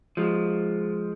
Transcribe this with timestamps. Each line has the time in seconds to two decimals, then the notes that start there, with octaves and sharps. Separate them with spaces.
0.17 F3 G#3